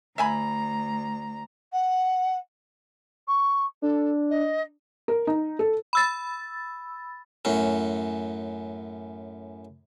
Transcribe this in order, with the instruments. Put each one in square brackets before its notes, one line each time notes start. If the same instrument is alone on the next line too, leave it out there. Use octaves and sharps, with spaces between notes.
[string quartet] D2 A#5 [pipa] E5 G#5 B5
[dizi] F#5
C#6
[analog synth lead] D4 [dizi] A4
[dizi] D#5
[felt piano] A#4
D#4
A4
[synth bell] B5 E6 A6
[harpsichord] F#2 A2 C#4